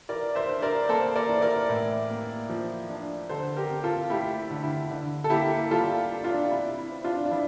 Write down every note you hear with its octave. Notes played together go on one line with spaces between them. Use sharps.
E3 A#4 D5
C5 E5
D4
A#4 D5
A#3 A4 C5
A#4 D5
E3
A#4 D5
A2
A#3
F3
D4
D3 A4 C5
G4 A#4
C4
F4 A4
A3 E4 G4
D3
E4
D3
A4
A#3 E4 G4
G3 F4 A4
D4
D4 F4
C3 E4
E4
C4
D4 F4
D4
F3 E4